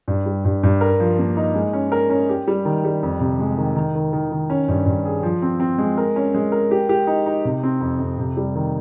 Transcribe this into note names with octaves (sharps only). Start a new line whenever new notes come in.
G2
G3
G2
G2
A#4
F3
A#3
D#4
G#3
C#4
A#4
C#4
G4
G3
D#3
G3
F2
C3
G#3
D#3
D#3
D#3
D#3
D#3
C#4
G2
G2
G#4
F3
C4
C4
G#3
A#4
C#4
G#3
A#4
G4
G4
D#4
D#4
C3
C4
F2
F2
C3
G3
D#3